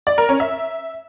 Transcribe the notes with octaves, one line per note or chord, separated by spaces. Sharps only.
D5
A#4
C#4
E5